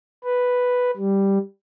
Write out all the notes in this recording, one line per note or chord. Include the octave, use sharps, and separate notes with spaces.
B4
G3